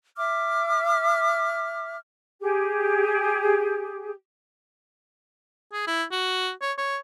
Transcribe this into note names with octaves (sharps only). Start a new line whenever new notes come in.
E5 D6 F6
G4 G#4
G#4
E4
F#4
C#5
C#5